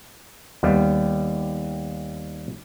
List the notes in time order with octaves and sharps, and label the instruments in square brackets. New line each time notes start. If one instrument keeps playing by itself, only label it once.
[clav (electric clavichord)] D#2 G3 B3